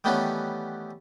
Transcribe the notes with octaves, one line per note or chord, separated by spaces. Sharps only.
D#3 E3 G3 A3 B3 C#4